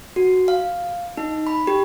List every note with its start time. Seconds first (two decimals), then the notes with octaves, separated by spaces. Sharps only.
0.16 F#4
0.48 F5
1.17 D#4
1.47 B5
1.67 G4